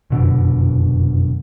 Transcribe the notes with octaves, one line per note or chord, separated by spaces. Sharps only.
F1 F#2 B2 D3